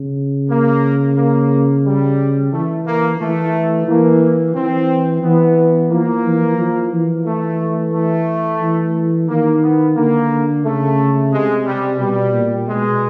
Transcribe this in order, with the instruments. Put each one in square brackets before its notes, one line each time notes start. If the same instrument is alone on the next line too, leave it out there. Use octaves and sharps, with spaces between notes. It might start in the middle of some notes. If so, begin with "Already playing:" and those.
Already playing: [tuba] C#3
[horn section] A#3
A#3
G3
[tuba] E3 [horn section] A3
[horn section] A#3
[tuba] E3 [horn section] A3
[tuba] E3 [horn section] A#3
[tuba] E3 [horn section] C4
[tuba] E3 [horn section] B3
[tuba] F3 [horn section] A#3
[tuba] E3
F3
E3
[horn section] A3
A3
[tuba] E3
[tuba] D#3 [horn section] A#3
[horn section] B3
[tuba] D3 [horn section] A#3
[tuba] C#3 [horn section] A3
[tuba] C3 [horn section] G#3
[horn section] G3
[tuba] B2 [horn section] G3
[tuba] A#2
[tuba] B2 [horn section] G#3